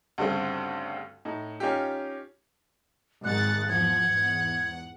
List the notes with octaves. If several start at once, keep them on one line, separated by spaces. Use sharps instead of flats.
D2 G2 C#3 C4
A2 D#4
C#4 D#4 F4 G4
G#1 D#3 G#3 F#5 F#6 A6
G#1 E2 F3 F#5 G#6
E2 G#2